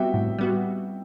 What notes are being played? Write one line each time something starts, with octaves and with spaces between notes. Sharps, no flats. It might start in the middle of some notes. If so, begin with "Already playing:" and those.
Already playing: G3 B3 F#4 E5 G5
A2
G3 B3 F#4